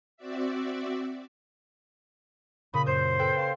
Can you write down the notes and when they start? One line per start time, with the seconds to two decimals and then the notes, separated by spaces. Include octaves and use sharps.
0.17 C4 F#4 D5 E5
2.73 A#2 C#3 B5 D#6
2.86 F#2 C5 G6 E7
3.19 A4 B4 G5
3.37 F5 A5 C6